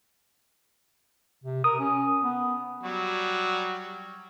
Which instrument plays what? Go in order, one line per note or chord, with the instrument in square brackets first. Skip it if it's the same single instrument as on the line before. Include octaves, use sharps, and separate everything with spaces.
[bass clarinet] C3
[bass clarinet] A#4 [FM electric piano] D#6
[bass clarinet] C#4
B3
[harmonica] F#3 G3 F#4